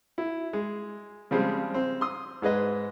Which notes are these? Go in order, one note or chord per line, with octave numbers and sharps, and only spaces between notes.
E4
G#3
C#3 F3 G3 G#3 C4
C4
C6 D#6
G#2 G#3 B4 D#5